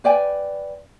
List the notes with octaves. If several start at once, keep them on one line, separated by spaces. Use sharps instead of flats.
B4 D5 G5 G#5